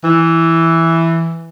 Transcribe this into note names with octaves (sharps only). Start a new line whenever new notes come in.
E3